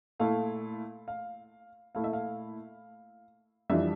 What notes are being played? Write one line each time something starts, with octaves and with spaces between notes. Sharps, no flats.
A#2 A3 E4 F5
F5
A#2 A3 E4 F5
E5
F5
F2 E3 G3 D4 F4 E5